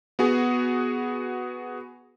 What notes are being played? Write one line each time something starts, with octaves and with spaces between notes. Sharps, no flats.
B3 F#4 G#4